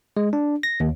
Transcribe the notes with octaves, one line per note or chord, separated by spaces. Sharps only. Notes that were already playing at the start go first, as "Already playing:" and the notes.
G#3
D4
A#6
D#2